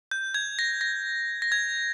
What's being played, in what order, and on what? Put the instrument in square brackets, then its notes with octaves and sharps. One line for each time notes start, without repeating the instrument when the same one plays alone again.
[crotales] G6
G#6
A#6
A#6
A#6
G#6